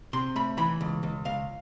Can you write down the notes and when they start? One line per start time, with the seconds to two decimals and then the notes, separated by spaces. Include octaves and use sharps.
0.13 C3 C6
0.36 A3 B5
0.58 E3 B5
0.81 C#2
1.03 C#2
1.25 C#2 F5